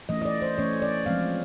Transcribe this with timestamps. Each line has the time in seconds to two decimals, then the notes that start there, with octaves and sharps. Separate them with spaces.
0.09 E3 A3 C#4 D#5
0.22 D#5
0.25 D5
0.42 C5
0.58 E3 A3 C#4 C#5
0.82 D5
1.06 F3 G#3 C4 F5